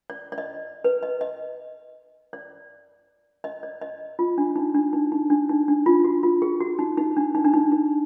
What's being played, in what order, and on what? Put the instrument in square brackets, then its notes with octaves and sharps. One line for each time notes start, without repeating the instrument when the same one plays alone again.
[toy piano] D5
D5
D#5
B4
D#5
D#5
D5
D#5
D5
D#5
F4
D4
D#4
D4
D#4
D#4
D4
D#4
D4
F4
F#4
F4
G#4
F#4
D#4
D#4
D4
D#4
D4
D#4
D#4